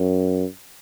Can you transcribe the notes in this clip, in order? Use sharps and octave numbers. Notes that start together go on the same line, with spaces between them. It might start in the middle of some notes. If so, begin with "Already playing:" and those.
Already playing: F#2